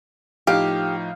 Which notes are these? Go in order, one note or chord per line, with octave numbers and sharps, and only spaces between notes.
A2 F3 D#4 G4 F5